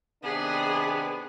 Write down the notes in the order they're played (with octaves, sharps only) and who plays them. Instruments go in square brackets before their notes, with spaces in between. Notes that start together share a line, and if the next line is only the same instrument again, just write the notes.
[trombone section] C3 D#3 D4 [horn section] B3 [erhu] G#4